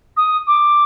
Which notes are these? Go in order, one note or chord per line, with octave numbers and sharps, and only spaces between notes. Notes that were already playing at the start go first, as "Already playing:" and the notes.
D#6
D6